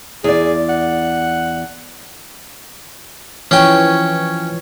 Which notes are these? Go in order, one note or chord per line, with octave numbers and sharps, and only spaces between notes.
E2 G#4 D5
F#5
E3 F3 C#4 C#5 G5